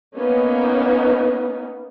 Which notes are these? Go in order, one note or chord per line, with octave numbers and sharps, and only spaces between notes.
A#3 B3 C#4 D#4